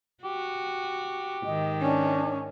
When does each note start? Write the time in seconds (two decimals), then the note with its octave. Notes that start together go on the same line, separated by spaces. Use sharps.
0.24 F#4 G4
1.45 G#2 D#3 D#5
1.81 C#4 D4